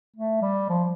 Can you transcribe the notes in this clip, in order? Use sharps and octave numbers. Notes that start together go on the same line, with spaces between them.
A3
G3
F3